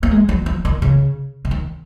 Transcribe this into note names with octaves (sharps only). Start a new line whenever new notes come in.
A#3
G#3
F#3
F3
D#3
C#3
C#3
D#3